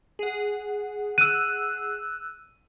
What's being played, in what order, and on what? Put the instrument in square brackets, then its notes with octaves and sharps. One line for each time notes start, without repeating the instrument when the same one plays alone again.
[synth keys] G#4 F#5
[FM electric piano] E6 F#6 [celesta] D#7